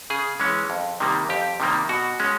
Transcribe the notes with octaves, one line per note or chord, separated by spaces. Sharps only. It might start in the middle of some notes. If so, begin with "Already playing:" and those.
C#3 G#4
E3 G#3 C#4
F2
C3 D#3 G3 A#3
F2 G4
C3 D#3 G3 A#3
B2 F#4
G#3 C#4